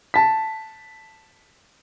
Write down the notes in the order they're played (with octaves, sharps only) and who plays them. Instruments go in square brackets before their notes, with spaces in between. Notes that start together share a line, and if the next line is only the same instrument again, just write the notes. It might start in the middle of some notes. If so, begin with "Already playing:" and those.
[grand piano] A5 B6